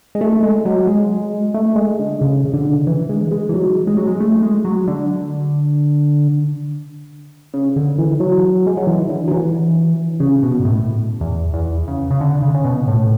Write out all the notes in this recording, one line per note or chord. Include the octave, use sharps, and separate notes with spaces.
G#3
A3
G#3
F#3
G#3
A3
G#3
D3
C#3
C#3
D3
E3
G#3
G#3
E3
F#3
G#3
F#3
G#3
A3
G#3
F#3
D3
C#3
D3
E3
F#3
G#3
F#3
E3
D3
F#3
E3
C#3
B2
G#2
A2
E2
E2
C#3
C#3
D3
C#3
C#3
B2
A2